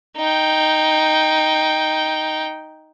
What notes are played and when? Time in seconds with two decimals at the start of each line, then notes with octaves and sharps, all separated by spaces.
0.17 D#4 G5